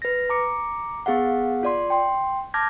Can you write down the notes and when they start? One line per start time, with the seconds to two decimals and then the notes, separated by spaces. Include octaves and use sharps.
0.02 B4 A#6
0.30 A#5 D6 C#7
1.06 B3 G#4 F5 F#5
1.63 F4 D5 C6
1.90 G5 C6
2.54 A5 D6 F6 G6 G#6 A#6